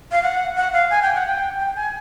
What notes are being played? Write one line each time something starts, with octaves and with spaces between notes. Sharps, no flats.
F5
F#5
F#5
F5
G#5
G5
F#5
G5
G5
G#5